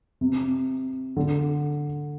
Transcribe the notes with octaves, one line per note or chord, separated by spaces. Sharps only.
C3
D3